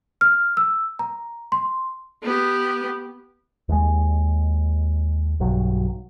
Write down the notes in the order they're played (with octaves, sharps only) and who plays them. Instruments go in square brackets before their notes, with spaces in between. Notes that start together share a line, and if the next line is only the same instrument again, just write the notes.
[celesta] F6
E6
A#5
C6
[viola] B3 G4
[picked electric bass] D#2 G#3
B1 G2 F#3